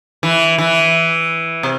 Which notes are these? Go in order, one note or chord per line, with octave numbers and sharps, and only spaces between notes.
E3
E3
C3